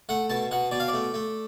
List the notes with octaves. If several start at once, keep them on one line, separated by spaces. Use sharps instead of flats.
A3 F#5
B2 A5
B2 F#5
B2 D5
F5
D5
A3
A3